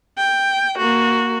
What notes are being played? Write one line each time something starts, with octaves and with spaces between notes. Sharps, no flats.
G5
A#3 F#4